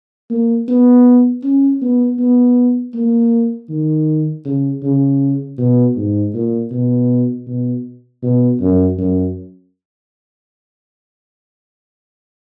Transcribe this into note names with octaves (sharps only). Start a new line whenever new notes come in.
A#3
B3
C#4
B3
B3
A#3
D#3
C#3
C#3
B2
G#2
A#2
B2
B2
B2
F#2
F#2